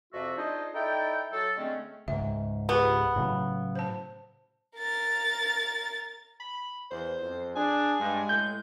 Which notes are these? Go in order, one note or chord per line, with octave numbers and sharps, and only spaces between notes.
F2 C3 F4 F#4 E5
D4 D#4 F4 G#4 C5 D#5
D#4 E4 A4 D5 G5
F#3 A4
D3 G#3 A3 C4 C#4
C#2 G#2 E5
B3 F4 G4 G#4
A2 C#3 F#3
C5 A5
A#4 A6
B5
E2 C5
F2
D4 G#4 G#5
G2 G#3
A2 G6